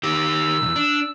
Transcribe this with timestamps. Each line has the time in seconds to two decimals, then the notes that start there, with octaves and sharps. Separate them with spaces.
0.03 D#3 G4 E6
0.62 B1 E2
0.76 D4